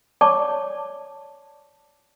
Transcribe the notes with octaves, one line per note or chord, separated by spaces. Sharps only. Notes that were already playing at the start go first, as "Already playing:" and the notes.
C#5 D5 A5 C#6 D6